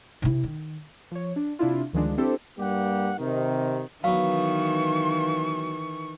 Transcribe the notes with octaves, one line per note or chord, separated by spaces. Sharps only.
C3 E4
D#3
F3 C#5
D4
C3 D4 E4 F4
D2 D#3 F3 G#3 D4
C4 D4 E4 G4 A4 C5
G2 G3 A#3 G4 F#5
C3 D#3
D#3 E3 F#3 B3 F5 C#6